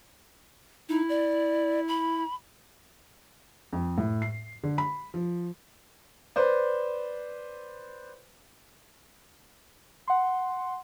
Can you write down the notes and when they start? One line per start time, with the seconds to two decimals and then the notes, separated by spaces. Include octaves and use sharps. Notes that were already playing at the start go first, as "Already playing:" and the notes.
0.89 D#4 E4
1.09 D5
1.88 B5
3.73 F2
3.98 A2
4.22 C7
4.64 D3
4.78 B5
5.14 F3
6.36 B4 C5 D5
10.08 F#5 C6